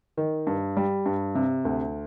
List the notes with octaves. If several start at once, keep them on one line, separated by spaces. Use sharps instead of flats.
D#3
G2
G3
G2
C3
D2